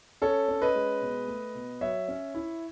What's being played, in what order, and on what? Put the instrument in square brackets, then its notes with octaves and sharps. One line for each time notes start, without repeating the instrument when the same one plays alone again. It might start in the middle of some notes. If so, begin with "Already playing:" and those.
[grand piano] C#4 A4 C#5
C#4
B4 D#5
G#3
B2
A3
B2
F#3 C#5 E5
C#4
E4